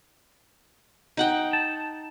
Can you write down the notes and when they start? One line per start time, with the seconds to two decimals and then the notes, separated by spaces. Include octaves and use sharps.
1.17 D#4 F#5 G5
1.53 A5